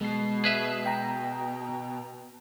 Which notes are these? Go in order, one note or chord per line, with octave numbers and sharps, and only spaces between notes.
B2 G#3 C7
G#4 B4 E5
G5 A#5